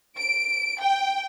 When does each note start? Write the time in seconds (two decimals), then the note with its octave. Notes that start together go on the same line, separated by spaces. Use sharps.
0.17 D7
0.80 G5